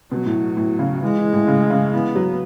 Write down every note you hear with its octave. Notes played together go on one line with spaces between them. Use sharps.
B2 F#3
A2
A2
C#3
E3 G#3
E3
A2
C#3
C#3
E3 B3
F#3